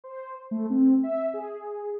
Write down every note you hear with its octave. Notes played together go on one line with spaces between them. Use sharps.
C5
A3
C4
E5
G#4